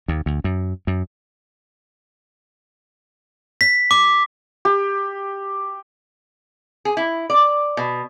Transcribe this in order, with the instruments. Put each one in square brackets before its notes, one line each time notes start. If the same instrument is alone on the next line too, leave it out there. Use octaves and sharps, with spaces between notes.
[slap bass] D#2
D2
F#2
F#2
[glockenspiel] B6
D6
[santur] G4
[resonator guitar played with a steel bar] G#4
E4
D5
B2